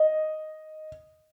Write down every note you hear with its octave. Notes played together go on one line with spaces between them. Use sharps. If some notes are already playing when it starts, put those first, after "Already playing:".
Already playing: D#5